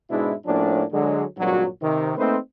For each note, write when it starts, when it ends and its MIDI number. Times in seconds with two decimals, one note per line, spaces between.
0.10 0.34 44
0.10 0.34 47
0.10 0.34 56
0.10 0.34 62
0.10 0.34 64
0.46 0.84 45
0.46 0.84 53
0.46 0.84 58
0.46 0.84 61
0.46 0.84 62
0.92 1.24 50
0.92 1.24 54
0.92 1.24 56
1.38 1.66 32
1.38 1.66 43
1.38 1.66 46
1.38 1.66 54
1.82 2.13 48
1.82 2.13 51
2.18 2.37 57
2.18 2.37 58
2.18 2.37 60
2.18 2.37 63
2.18 2.37 71
2.18 2.37 72